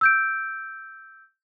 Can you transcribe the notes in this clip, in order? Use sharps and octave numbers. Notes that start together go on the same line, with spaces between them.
E6 G6 D7